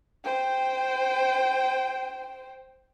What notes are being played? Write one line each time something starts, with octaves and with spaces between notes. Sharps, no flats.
C5 G5